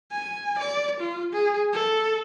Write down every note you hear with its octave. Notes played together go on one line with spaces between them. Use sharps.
G#5
D5
F4
G#4
A4